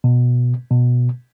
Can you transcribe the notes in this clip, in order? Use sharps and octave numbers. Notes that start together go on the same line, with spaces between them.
B2
B2